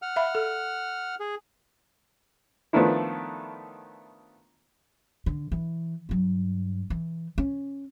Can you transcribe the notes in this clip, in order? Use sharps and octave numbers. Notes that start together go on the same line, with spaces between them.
F#5 F6
E5 F5 B5
A4
G#4
D#3 F3 A3 B3 D4 E4
D3
E3
G2 F#3
E3
C#4